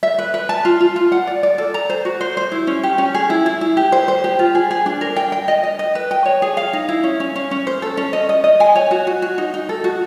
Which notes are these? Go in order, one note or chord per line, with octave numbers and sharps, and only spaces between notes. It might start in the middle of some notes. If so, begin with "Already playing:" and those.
E5
B4
B4
A5
F4
F4
F4
F#5
D5
D5
A4
A#5
C5
F#4
C5
C5
E4
C#4
G4
C#4
G#4
E4
E4
E4
G4
C5
C5
G4
F4
G#4
G#4
D4
A#4
G5
G5
D#5
D#5
D#5
B4
G5
C#5
G#4
F5
D#4
E4
C#4
C#4
C#4
C#4
C5
A4
C#4
D#5
D#5
D#5
G#5
C#5
F#4
F#4
F#4
D#4
D#4
A4
F#4